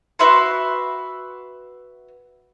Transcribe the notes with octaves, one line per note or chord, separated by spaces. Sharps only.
F#4 B4 E5 C6